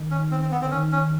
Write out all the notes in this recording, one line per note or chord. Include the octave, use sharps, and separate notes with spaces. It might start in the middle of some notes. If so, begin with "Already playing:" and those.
Already playing: D#3
C#4
C4
C4
B3
D3 C4
D#3 C#4
C#4